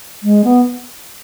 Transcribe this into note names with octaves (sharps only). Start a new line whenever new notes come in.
G#3
B3